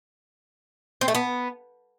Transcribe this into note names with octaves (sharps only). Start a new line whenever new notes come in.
C4
A3
B3